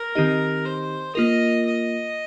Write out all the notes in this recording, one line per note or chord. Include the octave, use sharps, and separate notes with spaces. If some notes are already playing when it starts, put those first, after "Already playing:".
Already playing: A#4
D#3 C4 D#4 G4 D#5
C5
A#3 F4 A#4 D#5
D#5